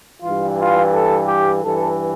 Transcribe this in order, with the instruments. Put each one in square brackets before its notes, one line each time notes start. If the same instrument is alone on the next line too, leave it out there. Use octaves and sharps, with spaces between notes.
[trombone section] G2 E3 F4
F4
A4
G4
G2 E3 A4